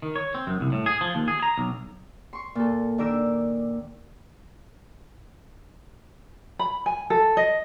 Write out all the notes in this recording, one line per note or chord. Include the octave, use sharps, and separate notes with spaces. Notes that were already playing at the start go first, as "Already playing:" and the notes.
D#3
C#5
C4
F#2
C2
A2
G#4
F3
D#2
G#4
A#5
B1
C6 C#6
A#2 A4
D#3 D4 A#4 D6 E6
B5
G#5
A4
D#5